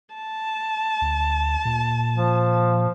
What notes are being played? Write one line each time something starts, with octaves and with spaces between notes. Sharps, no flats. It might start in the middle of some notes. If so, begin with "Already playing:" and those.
A5
D2
A#2
F3